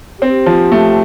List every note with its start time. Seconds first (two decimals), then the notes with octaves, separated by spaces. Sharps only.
0.21 C4 G4
0.46 F3
0.72 A3